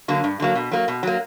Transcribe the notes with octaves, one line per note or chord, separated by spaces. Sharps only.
D3 F#3 A#3
G2
D3 F#3 A#3
B2
F#3 A#3
B2
F#3 A#3